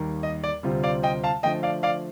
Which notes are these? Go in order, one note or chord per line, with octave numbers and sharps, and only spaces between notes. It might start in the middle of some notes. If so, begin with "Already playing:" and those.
Already playing: D#2 D#3 G3 A#3 D#4
D#5
D5
D2 C3 G3 C4 F4
D5 F5
D#5 G5
F5 A5
D3 F3 A3 D#5 G5
D5 F5
D5 F5